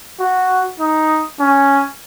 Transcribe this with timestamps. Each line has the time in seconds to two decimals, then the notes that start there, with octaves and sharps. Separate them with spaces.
0.20 F#4
0.80 D#4
1.40 C#4